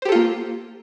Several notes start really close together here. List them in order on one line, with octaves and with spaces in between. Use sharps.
C5 G4 A4 F4 A#3